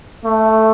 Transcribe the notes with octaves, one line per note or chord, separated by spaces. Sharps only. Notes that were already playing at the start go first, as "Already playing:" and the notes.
A3